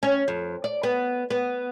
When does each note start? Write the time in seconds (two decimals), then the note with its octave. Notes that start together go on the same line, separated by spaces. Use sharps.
0.03 C#4
0.28 F2
0.64 D5
0.83 B3
1.30 B3